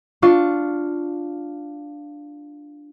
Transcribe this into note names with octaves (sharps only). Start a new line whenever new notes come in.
D4 F4 C#6